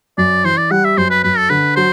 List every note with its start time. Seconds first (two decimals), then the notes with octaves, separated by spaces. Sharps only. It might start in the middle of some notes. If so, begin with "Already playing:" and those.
0.18 F#2 D5
0.44 E3 C5
0.57 D5
0.71 G3 F#5
0.85 E5
0.97 F#2 C5
1.10 B4
1.23 F#2 B4
1.37 A4
1.50 D3 B4
1.76 F#3 C5